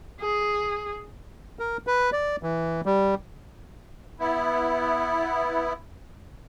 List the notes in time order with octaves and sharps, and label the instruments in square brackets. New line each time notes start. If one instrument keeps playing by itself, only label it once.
[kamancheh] G#4
[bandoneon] A#4
B4
D5
E3
G3
[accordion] B3 E4